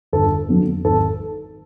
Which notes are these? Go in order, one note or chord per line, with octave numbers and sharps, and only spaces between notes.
G1 A4
F2 D3 F#3
G#1 A4